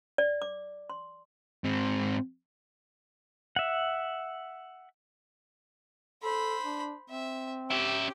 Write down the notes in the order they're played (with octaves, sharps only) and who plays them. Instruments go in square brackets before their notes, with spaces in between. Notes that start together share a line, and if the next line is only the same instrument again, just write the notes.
[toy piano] D5
D6
C6
[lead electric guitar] G#2 C4
[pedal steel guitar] E5 F#5
[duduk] A4 [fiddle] C5 B5
[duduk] D4
[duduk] C4 [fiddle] E5
[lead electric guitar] C#4 E5 [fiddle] G4